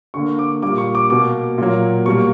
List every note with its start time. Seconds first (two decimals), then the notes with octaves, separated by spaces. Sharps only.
0.14 D3 A#3 C#6
0.39 D6
0.62 A#2 G3 A#3 D6
0.78 C#6
0.95 D6
1.10 B2 A#3 D6
1.58 A#2 F#3 A#3
2.06 B2 G3 A#3 C#6